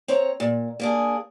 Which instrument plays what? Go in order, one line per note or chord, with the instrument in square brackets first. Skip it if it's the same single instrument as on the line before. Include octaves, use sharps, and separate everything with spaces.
[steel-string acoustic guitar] C4 C#5 A#5
A#2
A#3 D4 G#4